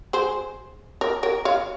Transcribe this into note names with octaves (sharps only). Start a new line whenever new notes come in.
G#4 C5
A#4 C#5
A#4 C#5
C#5 F5